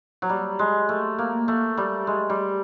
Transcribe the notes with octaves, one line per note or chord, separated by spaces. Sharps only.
F#3
G3
G#3
A3
A#3
A3
G3
G#3
G3